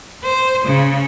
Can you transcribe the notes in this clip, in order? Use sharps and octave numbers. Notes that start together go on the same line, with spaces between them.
C5
C#3